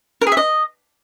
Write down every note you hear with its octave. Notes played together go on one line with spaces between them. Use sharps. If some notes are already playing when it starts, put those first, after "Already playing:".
A#4
G#4
E5
D#5